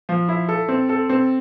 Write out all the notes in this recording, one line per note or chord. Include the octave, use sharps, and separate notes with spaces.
F3
E4
A4
C4
A4
C4